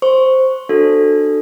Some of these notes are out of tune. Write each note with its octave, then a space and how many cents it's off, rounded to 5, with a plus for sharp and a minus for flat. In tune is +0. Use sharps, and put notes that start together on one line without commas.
C5 +0 C#6 +0
D4 +25 F#4 +0 A4 +0